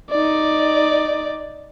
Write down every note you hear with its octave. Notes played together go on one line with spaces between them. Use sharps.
D#4 D5